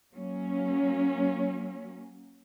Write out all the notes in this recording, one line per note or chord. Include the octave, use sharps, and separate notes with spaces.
F#3 A#3 C#4